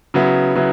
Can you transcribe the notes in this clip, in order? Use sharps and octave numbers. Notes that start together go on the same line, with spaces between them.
C#3 F#3 B3 E4
C#3 F#3 B3 E4